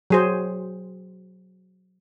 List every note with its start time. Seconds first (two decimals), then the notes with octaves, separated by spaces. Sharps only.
0.10 F#3 G#4 C5